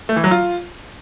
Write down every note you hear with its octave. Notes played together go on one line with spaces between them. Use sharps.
A3
E3
F#3
F4